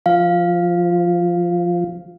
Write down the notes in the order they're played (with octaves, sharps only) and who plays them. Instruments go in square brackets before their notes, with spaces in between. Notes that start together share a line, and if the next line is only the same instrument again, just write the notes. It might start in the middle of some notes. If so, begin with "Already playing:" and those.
[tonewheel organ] F3 [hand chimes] F5